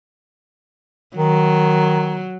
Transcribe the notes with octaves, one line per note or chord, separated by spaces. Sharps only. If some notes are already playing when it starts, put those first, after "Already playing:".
D#3 F#3